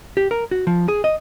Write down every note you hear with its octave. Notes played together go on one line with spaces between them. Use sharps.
G4
A#4
F#4
F3
G#4
D#5